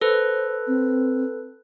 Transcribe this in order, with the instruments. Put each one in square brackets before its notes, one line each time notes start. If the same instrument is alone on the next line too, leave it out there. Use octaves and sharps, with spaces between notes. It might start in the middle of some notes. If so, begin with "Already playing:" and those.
[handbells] A4 B4 [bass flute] C5
[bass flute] C4